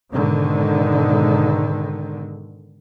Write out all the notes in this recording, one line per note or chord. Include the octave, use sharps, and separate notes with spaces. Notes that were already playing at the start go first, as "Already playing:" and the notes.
G#2 B2 D3 D#3 G#3